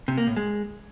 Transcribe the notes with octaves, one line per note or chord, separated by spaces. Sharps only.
C3
A#3
A2
G#3